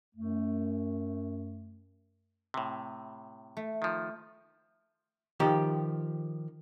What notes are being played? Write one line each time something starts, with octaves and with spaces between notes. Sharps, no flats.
F#2 A3
A2 C3
A3
D#3 F3
D#3 F3 G4 D#5